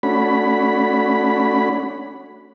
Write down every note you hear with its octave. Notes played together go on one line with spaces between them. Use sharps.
A3 C#4 D4 F#4 B5